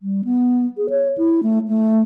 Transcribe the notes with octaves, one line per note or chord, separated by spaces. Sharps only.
G3
B3
G#4
C#5
E4
A3
A3